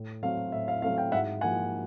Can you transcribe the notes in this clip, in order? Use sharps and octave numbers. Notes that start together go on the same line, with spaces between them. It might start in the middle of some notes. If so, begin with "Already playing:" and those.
Already playing: A2
F#3 A3 C4 F5
A2 E5
F5
F#3 A3 C4 F5
F5 G5
G#2 E5 F#5
F3 A#3 F#5 G#5